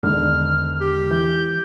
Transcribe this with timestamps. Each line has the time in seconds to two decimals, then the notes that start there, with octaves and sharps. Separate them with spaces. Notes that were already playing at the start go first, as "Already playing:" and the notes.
0.03 E1 G#2 D3 D#3 F6
0.81 G4
1.11 E3 G6